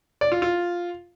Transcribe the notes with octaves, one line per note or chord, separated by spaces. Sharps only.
D5
F4
F4